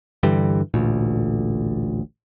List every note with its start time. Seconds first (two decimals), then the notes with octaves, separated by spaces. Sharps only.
0.23 G2 D3 E3 G3
0.74 A1 D2 A#2